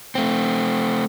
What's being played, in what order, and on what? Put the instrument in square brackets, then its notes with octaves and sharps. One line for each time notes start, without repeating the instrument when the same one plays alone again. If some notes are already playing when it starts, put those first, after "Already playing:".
[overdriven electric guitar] A3 C4